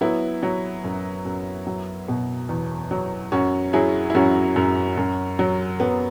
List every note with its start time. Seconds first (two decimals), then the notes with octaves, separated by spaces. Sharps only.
0.01 F#3 B3 E4
0.43 F#3
0.84 F#2
1.25 F#2
1.67 F#3
2.08 B2
2.49 E2
2.91 F#3
3.32 F#2 C#4 F#4
3.73 F#3 E4 G#4
4.10 E4
4.15 F#2 C#4 F#4
4.56 F#2
4.98 F#2
5.39 F#3
5.80 F#3 B3